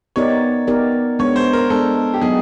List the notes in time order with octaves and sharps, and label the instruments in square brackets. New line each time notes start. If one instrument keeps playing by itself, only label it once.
[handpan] B3 D#4 G4 A#4 D5 [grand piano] C#5
[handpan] B3 D#4 G4 A#4 D5
[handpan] G#3 B3 D4 [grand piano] C#5
[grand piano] C5
A#4
[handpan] G#3 B3 D4 [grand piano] A4
[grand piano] G4
[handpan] F#3 B3 D#4 [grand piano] G#4